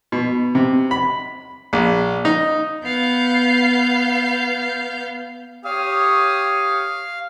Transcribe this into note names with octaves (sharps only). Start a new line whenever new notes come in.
B2
C3
B5
A#1
D#4
B3 F5 G6
G4 C#5 F5 D#6